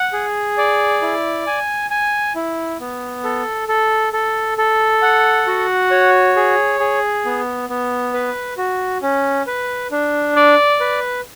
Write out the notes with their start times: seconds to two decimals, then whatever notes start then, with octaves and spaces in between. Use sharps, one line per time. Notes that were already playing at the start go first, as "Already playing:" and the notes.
Already playing: F#5
0.13 G#4
0.58 D5
1.02 E4
1.47 G#5
1.90 G#5
2.35 E4
2.80 B3
3.24 A4
3.68 A4
4.13 A4
4.58 A4
5.02 F#5
5.47 F#4
5.91 C#5
6.36 G#4
6.80 G#4
7.25 B3
7.69 B3
8.14 B4
8.58 F#4
9.02 C#4
9.47 B4
9.91 D4
10.36 D5
10.80 B4